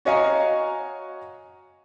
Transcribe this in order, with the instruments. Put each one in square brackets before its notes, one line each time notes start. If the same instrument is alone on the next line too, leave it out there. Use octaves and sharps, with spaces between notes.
[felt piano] F#4 C#5 D#5 F5 G#5 A#5